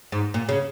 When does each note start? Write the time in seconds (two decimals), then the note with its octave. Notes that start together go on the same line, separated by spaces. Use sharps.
0.12 G#2
0.34 A#2
0.49 C#3